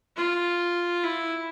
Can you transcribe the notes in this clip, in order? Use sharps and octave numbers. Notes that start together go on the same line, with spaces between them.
F4
E4